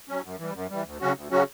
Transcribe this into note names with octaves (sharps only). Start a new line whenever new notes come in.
F#3 C#4
F#2
E3 G3
F#2
E3 G3
D2
C#3 F#3 C#4 F#4
D2
C#3 F#3 C#4 F#4